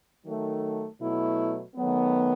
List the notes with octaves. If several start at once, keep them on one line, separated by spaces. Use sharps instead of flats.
D#3 F#3 A3
B2 F#3 A3 E4
D#3 F#3 A3 B3